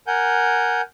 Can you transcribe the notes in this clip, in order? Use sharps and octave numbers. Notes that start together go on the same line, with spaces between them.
A#4 F#5 G#5 G6